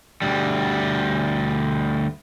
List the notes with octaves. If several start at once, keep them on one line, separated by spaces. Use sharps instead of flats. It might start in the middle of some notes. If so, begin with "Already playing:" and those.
D2 G3